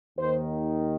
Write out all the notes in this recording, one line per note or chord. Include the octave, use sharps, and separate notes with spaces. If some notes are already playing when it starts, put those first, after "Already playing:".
D#2 D#3 C5